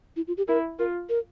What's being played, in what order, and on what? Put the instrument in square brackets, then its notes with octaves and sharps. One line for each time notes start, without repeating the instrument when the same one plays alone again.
[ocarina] E4
F4
G4
[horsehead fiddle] E4 [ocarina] A#4
[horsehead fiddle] F4 [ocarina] A#4
[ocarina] A#4